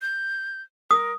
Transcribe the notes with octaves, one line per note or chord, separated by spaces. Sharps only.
G6
A#4 D#6